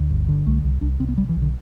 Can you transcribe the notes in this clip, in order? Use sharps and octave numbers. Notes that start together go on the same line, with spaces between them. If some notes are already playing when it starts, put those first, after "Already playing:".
Already playing: D2
G1
D3
C2 A3
C2
C2 D4
C2 C4
B3
B1 G3
E3
B1
D3